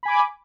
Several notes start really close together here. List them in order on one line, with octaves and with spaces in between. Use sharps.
B5 G#5 D6